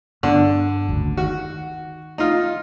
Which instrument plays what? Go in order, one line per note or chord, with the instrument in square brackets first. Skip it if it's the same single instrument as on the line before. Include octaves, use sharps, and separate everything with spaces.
[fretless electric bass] G2 B3 D4 [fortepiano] D3
[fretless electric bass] F#1 D2 G#2
[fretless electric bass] D#3 [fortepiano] F#4
[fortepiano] D#4 F4